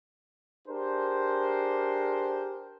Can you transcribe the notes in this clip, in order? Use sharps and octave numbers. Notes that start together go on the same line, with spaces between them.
D4 G4 G#4 A#4 C5